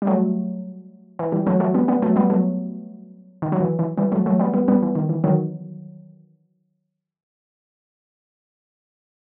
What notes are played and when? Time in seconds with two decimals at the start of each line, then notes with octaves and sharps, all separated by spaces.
0.02 G3
0.07 F#3 A3
1.19 E3
1.32 E3 G3
1.47 F#3 A3
1.60 F#3 A3
1.74 G3 B3
1.88 G3 B3
2.02 F#3 A3
2.16 G3 B3
2.30 F#3 A3
3.42 D#3
3.52 F#3
3.61 E3
3.79 E3
3.98 E3 G3
4.12 F#3 A3
4.26 F#3 A3
4.39 G3 B3
4.54 G3 B3
4.68 G3 B3
4.82 E3
4.95 D#3
5.09 E3
5.24 D#3 F#3